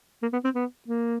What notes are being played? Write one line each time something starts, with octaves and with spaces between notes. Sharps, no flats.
A#3
B3
C4
B3
A#3